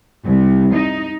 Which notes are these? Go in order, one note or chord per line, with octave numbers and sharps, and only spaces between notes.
C2
D#4